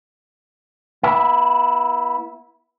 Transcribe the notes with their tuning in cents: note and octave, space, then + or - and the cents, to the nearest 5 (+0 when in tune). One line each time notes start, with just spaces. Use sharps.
B3 -40 E4 +0